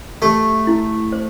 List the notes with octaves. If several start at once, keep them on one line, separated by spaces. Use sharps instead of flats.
A3 G4
E4
C5